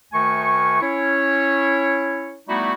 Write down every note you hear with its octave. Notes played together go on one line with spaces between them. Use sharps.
D2 D#3 A3 G#5 C#6
C#4 E4 C#5
G3 A3 B3 D#4 E4 F#4